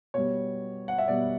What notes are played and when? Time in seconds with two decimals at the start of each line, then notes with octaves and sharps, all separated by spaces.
0.14 B2 G3 C#5
0.88 F#5
0.98 E5
1.08 B2 G3 D5